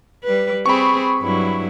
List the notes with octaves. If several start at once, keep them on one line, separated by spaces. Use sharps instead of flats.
G3 B4
C4 G#4 B5 C#6
G2 F#3 E4